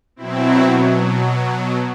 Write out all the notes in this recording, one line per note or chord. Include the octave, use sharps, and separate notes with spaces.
B2 F#3 C4 E4